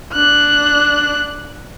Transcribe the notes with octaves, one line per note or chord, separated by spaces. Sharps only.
D4 F#6